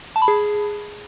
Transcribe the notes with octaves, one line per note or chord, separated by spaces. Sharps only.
A5
B5
G#4